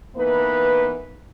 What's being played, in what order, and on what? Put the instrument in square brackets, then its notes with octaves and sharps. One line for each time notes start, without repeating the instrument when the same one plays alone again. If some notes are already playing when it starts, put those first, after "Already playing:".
[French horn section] E3 A#3 B3 D#4 B4